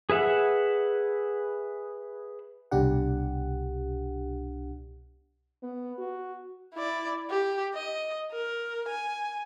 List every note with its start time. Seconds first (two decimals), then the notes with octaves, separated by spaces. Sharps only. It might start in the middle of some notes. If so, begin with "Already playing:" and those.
0.10 G#4 B4 E5 F#5
2.71 C2 B2 D4 G4 F#5
5.63 B3
5.99 F#4
6.74 E4 D5
7.30 G4
7.74 D#5
8.32 A#4
8.88 G#5